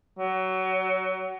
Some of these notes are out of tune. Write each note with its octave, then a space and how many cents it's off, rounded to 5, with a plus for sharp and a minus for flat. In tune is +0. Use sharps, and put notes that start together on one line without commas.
F#3 +20